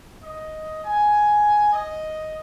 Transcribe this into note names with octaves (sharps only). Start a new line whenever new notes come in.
D#5
G#5
D#5